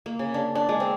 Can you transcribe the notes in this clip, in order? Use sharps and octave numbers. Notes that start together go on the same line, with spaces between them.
A#3
C#3
D4
D4
G#3
C4